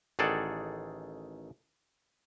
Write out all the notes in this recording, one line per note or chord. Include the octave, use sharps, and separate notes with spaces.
A1 D#3 G#4 A4 D5 F#5